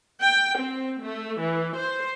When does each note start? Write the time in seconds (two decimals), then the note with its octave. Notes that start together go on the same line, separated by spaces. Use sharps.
0.21 G5
0.58 C4
1.01 A3
1.40 E3
1.76 C5